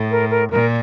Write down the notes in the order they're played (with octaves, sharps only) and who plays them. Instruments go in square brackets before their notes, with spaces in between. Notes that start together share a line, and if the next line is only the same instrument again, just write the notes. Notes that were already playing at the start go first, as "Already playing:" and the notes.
Already playing: [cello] A2
[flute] A#4
A#4
[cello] A#2 [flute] A#4